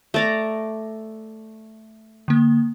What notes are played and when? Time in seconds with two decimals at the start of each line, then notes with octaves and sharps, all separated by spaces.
0.14 A3 D5 A#5
2.28 D3 A#3